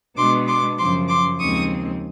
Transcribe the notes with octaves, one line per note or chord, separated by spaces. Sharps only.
B2 G#3 B3 D4 C6 D6
C6 D6
F#2 C#3 F3 C6 D6
C6 D6
D#2 C#3 F3 G#3 C4 C#6 D#6